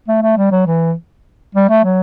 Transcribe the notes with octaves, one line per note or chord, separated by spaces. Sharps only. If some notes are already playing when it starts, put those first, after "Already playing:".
A3
A3
G3
F#3
E3
G3
A3
F#3